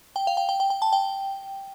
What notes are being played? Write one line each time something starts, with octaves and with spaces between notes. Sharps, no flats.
G5
F5
G5
G5
G5
G5
A5
G5